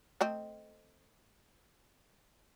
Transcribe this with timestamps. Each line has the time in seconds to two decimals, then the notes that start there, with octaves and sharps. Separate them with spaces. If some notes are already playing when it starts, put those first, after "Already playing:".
0.21 A3 C4 D#5